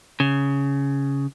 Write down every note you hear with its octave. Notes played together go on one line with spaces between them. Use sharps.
C#3